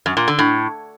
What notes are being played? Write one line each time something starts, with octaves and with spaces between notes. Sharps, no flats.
F#2
A#2
D3
A2